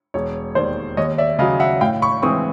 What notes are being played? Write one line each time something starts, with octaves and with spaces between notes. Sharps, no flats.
E1 C#5
D#2 D#3 C5 D5
D#2 C#5 D#5
D5 E5
C#3 F#3 D#5 F5
E5 F#5
A2 F5 G5
B5 C#6
E3 G#3 C4 C#6 D#6